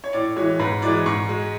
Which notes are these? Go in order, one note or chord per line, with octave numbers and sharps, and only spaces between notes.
C#5
A2 D5
E3 G#3 C#5
G#2 B4
E3 D5
G#3
G#2 C#6
G#3